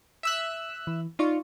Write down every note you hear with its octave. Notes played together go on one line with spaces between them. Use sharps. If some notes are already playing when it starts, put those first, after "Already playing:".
E5 E6 F#6
E3
D#4 F4 D5 C#6